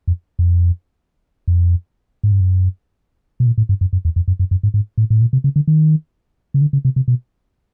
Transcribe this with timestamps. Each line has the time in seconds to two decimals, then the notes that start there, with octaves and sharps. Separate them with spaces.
0.08 F2
0.39 F2
1.48 F2
2.23 G#2
2.32 G2
2.41 F#2
3.40 B2
3.47 A#2
3.58 A2
3.69 G2
3.81 F#2
3.93 F#2
4.05 E2
4.16 F2
4.28 F#2
4.39 F#2
4.51 F#2
4.63 G#2
4.74 G#2
4.98 A2
5.10 A2
5.21 A#2
5.33 C3
5.44 C#3
5.56 D3
5.67 D#3
6.54 C#3
6.61 D3
6.73 C#3
6.85 C3
6.96 C3
7.08 B2